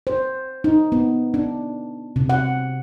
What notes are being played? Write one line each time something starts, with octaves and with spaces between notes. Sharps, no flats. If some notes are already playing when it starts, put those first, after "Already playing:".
C5
D#4
B3
D4
C3
F#5